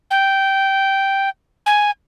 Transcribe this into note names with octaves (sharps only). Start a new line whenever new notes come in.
G5
G#5